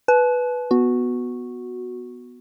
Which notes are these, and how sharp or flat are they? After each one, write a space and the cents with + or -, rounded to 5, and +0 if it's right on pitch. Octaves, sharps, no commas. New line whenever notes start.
B4 +0 A5 -40
B3 +0 F#4 -10